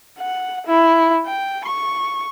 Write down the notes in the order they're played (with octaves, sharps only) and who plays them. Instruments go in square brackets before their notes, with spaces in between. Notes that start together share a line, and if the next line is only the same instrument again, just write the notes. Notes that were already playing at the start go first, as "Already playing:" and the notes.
[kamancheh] F#5
E4
G5
C#6